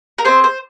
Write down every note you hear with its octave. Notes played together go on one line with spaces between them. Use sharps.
A#4
C4 G#4 C5
C5